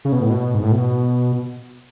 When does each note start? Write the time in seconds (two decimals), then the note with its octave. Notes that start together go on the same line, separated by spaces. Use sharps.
0.05 C#3
0.12 B2
0.22 A2
0.30 B2
0.54 G#2
0.63 A2
0.72 B2